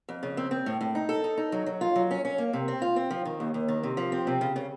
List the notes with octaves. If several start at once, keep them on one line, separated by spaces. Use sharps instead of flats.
F2
C#3
C4
C4
A2
A2
D#4
A4
D#4
D#4
F#3
F#3
F4
F#3
C#4
C#4
A#3
C3
C4
F4
C4
F3
D#3
D#2
D#2
D#3
C3
F3
C4
C3
C#3
C#3